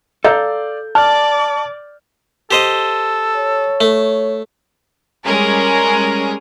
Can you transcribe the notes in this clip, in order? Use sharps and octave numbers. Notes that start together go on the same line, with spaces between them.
A4 D5 F5 A#5 G6
D5 A5 D6 F6
G4 A4 C5 D#5
C#5
A3
G3 G#3 C#4 G#4 A#4